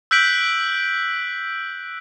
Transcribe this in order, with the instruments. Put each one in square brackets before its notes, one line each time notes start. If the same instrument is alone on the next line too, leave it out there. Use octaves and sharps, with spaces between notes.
[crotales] E6 F#6 G6 B6 D7 F#7